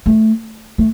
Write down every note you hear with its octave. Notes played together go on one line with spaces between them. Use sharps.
A3
A3